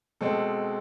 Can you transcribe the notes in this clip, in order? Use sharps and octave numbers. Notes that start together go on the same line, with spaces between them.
B2 G#3 C4 A4